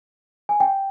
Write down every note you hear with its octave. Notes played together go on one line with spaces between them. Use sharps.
G#5
G5